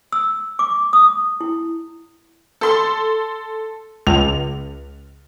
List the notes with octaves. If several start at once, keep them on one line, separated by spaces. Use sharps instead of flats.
E6
D6
D#6
E4
A4 C6
C#2 F7